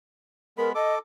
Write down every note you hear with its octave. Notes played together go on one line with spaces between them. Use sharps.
G#3 B3 A#4 B5
A4 D#5 D6